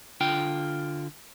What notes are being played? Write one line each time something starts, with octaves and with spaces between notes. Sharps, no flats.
D3 F4 G5